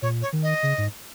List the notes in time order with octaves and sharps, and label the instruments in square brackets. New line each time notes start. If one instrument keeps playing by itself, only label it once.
[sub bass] A#2 [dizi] C#5
[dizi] C#5
[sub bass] D#3
[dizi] D#5
[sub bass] C#3
G#2